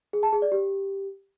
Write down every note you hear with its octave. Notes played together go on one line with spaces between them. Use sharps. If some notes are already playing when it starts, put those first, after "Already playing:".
G#4
A5
G#4
D5
G4